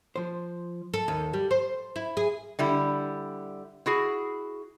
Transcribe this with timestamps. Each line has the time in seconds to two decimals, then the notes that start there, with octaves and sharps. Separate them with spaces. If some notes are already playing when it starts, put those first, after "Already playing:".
0.16 F3 C5
0.94 A4
1.08 D#2
1.33 G3
1.51 C5
1.96 E4
2.17 G#4
2.59 D3 G3 E4
3.86 E4 F#4 G#4